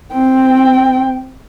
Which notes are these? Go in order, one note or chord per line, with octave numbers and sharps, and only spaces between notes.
C4 G5